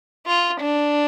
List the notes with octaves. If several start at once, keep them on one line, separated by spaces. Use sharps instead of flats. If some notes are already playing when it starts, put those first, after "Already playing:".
F4
D4